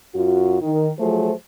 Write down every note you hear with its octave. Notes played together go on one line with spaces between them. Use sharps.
F#2 F4 F#4
D#3
F3 F#3 A3 G#4 C5